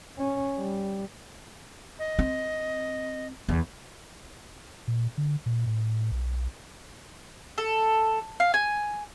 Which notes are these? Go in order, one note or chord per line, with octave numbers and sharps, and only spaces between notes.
C#4
G3
D#5
C4
E2
A#2
D3
A#2
A2
B1
A4
F5
G#5